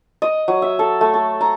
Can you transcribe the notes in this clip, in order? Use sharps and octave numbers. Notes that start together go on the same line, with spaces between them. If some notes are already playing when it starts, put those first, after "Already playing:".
D#5
F#3
E5
A4
A3
A4
A#5